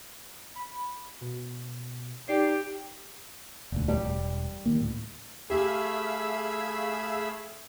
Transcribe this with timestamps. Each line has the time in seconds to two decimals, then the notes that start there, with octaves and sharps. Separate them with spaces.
0.56 B5
1.21 B2
2.28 D#4 G4 D5 C7
3.72 E1 D2
3.88 G3
4.04 E1
4.66 D#3 A#3
4.80 D2 A2
5.50 A3 G4 G#4 E5 F5 B5 E6